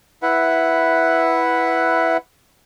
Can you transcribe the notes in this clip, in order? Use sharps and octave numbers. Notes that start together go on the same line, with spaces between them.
E4 B4 E5 F#5